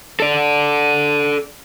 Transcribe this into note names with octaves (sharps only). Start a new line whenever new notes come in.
A4 D5